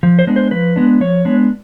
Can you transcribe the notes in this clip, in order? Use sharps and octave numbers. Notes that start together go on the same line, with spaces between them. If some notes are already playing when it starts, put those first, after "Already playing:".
F3
C5
G#3 B3 D4
C5
F3 B4
G#3 B3 D4
F3 C#5
G#3 B3 D4